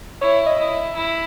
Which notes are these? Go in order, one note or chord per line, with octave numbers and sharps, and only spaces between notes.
E4 C#5
D#5
E4
E4